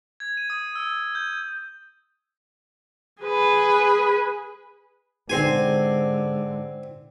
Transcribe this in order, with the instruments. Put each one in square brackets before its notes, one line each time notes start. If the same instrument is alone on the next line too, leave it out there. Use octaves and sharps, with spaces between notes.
[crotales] G#6
D#7
D#6
E6
G6
[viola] G#4 B4
[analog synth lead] G#2 [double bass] D3 [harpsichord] C4 C5 G#5